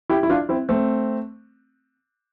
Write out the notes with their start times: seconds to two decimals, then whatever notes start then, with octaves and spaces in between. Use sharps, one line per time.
0.10 E4 G4
0.23 E4
0.29 D4 F4
0.49 C4 E4
0.69 A3 C4